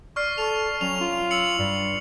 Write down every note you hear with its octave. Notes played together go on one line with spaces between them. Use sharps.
D5 C#6 F6 C7
A4 C#6 F7
F#3 C#4 F7
F4
E6 C#7 F#7
G2 G3